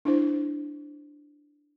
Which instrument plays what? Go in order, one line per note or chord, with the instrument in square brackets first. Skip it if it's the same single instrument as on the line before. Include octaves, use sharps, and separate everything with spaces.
[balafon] D4 E4 C5